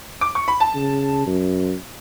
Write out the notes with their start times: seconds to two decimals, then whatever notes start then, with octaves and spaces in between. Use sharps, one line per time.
0.21 D6
0.35 C#6
0.48 B5
0.60 A5
0.75 C#3
1.26 F#2